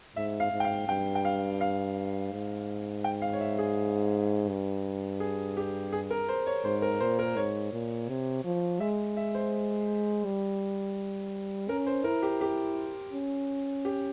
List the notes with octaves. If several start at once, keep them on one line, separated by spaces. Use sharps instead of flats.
G#2 E5
F5
G#2
G5
F5
G2 G5
G5
F5
F5
G#2
G5
F5
C#5
E5
G#4
G2
G#4
G4
G#4
A#4
C5
C#5
G#2 C5
A#4
A#2 C5
A#4
G#2 C#5
A#2
C3
F3
G#3 E5
E5
C5
G3
C#4 A#4
C5
E4 A#4
G4
G4
C#4
G4